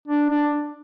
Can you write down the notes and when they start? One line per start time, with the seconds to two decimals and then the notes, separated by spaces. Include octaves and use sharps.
0.08 D4
0.30 D4